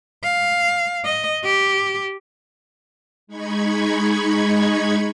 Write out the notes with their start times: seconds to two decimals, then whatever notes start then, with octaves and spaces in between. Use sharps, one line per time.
0.24 F5
1.05 D#5
1.44 G4
3.27 G#3 D#4 B5 C#6 G#6